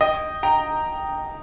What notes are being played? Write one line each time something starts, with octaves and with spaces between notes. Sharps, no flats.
D#5 G5
G5 A#5